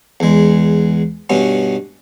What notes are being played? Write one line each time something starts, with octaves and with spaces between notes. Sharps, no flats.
E2 G#3
G2 B2 B3 C#4